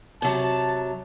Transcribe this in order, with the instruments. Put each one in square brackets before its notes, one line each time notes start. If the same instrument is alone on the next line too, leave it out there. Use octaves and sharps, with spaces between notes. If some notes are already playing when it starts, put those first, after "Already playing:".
[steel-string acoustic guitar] C3 F#3 [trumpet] A5